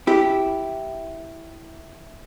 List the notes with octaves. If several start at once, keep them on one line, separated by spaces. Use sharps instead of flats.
E4 G4